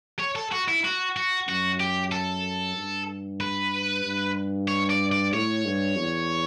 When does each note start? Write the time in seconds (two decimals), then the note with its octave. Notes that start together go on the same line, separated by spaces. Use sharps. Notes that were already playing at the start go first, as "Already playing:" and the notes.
0.19 C#5
0.36 A4
0.52 F#4
0.68 E4
0.85 F#4
1.17 F#4
1.48 F#2 F#4
1.80 G4
2.12 A4
2.76 G2
3.41 B4
4.05 G2
4.68 C#5
4.90 D5
5.12 D5
5.33 A2 C#5
5.65 G2
5.97 E2